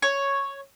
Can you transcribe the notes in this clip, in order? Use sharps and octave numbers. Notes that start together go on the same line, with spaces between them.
C#5